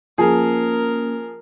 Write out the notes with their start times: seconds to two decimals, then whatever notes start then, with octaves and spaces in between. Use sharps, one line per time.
0.18 F3 A#3 C#4 G#4 A#4